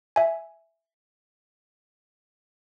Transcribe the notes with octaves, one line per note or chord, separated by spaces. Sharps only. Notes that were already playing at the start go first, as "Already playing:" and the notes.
E5 G#5